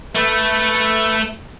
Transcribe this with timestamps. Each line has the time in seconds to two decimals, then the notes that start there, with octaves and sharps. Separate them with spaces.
0.15 A3 B4 E5 A5